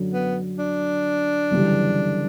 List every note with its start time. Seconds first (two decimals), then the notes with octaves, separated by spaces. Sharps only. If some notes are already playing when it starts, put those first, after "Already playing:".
Already playing: F#2 D3 F#3
0.13 B3
0.59 D4
1.51 G1 F#2 C#3 E3 G3